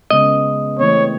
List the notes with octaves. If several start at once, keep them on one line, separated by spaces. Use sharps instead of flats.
C#3 G#3 B3 D#5
E3 A3 C4 C#5